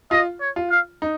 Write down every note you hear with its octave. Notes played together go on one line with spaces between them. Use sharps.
F4 D#5
C#5
F4
F5
D#4